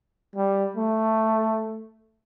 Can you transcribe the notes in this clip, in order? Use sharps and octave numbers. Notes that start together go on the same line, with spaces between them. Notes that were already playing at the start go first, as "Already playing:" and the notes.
G3
A3